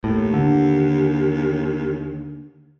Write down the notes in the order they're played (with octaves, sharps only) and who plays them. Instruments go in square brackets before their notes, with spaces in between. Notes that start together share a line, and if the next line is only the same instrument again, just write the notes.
[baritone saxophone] D#2 [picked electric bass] A2
[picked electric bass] D3